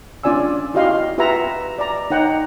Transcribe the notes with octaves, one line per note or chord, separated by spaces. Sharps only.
C#4 D4 F4 D5 G#5 E6
E4 F#4 G4 D#5 F5 C6
F4 G4 B4 E5 F#5 A#5
D5 A#5
D#4 C#5 F#5 G5 A#5